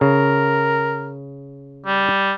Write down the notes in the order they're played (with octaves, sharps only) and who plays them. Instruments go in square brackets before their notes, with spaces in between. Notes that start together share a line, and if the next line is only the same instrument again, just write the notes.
[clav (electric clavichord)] C#3 [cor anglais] A#4
[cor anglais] G3